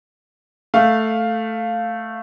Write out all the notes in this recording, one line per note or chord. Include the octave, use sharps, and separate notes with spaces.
A3 F5